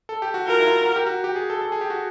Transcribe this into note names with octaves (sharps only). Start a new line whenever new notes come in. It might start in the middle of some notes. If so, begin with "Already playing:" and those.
A4
G4
F#4
F4 A#4
E4
F4
F#4
G4
F#4
G4
G#4
A4
A4
G#4
G4
F#4